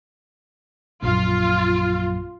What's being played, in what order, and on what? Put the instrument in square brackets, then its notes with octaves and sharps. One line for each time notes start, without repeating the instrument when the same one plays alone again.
[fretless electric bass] A#1 F#2 [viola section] F4